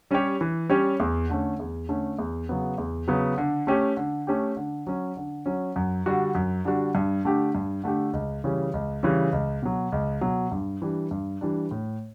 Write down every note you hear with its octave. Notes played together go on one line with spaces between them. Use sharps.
G3 C#4 G4 C#5
E3
G3 C#4 G4 C#5
E2
D3 A3 C#4
E2
D3 A3 C#4
E2
C#3 F#3 B3
E2
C#3 F#3 B3
D3
A3 C#4 G4
D3
A3 C#4 G4
D3
F#3 C#4
D3
F#3 C#4
F#2
D3 G3 D4 F#4
F#2
D3 G3 D4 F#4
G2
D3 A3 D4 G4
G2
D3 A3 D4 G4
C#2
C#3 E3 G3 C#4
C#2
C#3 E3 G3 C#4
C#2
B2 F#3
C#2
B2 F#3
G2
E3 G3 D4
G2
E3 G3 D4
A2